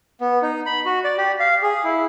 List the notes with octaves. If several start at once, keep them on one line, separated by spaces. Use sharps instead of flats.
B3
D#4
B5
F#4
D5
G4
F5
G#4
E4